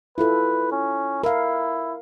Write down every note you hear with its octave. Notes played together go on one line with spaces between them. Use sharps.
E4 F4 A4 B4
C#4
E4 A#4 F5